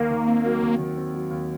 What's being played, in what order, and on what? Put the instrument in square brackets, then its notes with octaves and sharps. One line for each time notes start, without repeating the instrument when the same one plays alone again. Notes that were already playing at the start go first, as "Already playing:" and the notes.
Already playing: [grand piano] D#2 [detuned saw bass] A#3
[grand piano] D#3
C4
F#3
D#2
D#3
C4
F#3
D#2